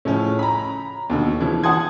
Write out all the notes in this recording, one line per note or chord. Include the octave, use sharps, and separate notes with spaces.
A2 C#3 F3 C#4
A#5 B5
D#2 B2 D3
C#3 E3 F3
F#5 A5 C6 D#6 G#6